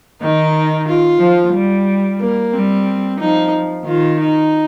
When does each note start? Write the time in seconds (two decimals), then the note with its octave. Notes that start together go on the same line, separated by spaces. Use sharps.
0.21 D#3 D#4
0.88 F4
1.21 F3
1.54 G3
2.20 A#3
2.53 G3 C4
3.19 F3 D#4
3.85 D#3 F4
4.19 D#4